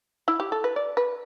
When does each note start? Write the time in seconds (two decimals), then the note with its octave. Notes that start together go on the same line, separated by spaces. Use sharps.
0.28 E4
0.40 G4
0.52 A4
0.64 B4
0.76 D5
0.97 B4